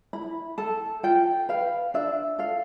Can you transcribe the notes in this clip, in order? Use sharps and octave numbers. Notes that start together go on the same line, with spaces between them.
E4 B5
A4 A5
F4 G5
B4 F5
D4 E5
A4 F5